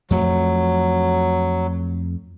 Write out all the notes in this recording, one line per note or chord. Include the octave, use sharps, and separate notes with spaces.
F2 F#3 A3